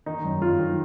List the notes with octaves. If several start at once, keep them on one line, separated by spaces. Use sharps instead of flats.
D#3 D#4
F#2
F#2 F4
D#3